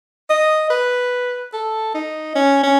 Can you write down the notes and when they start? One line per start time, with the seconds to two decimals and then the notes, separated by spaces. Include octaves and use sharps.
0.30 D#5
0.70 B4
1.53 A4
1.94 D#4
2.35 C#4
2.63 C#4